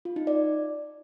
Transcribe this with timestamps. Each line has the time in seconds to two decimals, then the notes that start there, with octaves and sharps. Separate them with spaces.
0.05 F4
0.16 D#4
0.27 D5